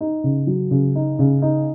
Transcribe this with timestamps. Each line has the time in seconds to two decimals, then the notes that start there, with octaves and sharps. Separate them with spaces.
0.01 D#4
0.24 C#3
0.47 F#3
0.71 C#3
0.95 D#4
1.19 C#3
1.42 D#4